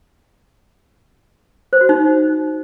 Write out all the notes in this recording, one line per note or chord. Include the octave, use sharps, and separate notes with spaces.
C5
F#4
D#4